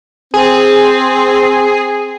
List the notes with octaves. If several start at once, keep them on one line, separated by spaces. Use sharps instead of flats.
C4 G#4